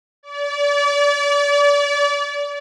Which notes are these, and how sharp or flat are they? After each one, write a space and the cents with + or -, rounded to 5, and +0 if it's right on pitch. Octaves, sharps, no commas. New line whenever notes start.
D5 -35